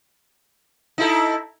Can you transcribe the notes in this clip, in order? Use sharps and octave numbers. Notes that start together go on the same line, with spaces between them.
D#4 E4 A4